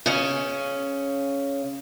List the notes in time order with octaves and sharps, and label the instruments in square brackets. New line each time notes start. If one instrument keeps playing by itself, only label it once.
[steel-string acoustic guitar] C#3 C#4